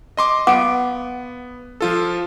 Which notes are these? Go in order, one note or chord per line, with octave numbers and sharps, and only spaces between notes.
D#5 C6 D6
B3 F5 F#5 D6 D7
F3 F4 A4